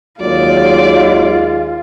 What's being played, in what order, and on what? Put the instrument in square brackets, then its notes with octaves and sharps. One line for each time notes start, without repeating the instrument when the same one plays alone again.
[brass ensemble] D#2 G#3 [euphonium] F#3 [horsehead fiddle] F4 [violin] D5